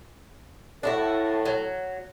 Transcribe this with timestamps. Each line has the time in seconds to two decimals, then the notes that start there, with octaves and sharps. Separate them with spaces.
0.83 A2 D4 E4 F#4 A4
1.45 F#3